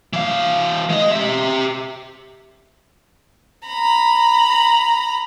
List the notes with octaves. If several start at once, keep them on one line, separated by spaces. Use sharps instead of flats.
E3 F5
G#3 D#5
G4 E5
A#5 B5